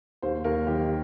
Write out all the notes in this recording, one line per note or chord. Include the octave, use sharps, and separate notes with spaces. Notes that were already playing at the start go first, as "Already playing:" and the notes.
D#2 C5
D#2 A#4
D#3 G4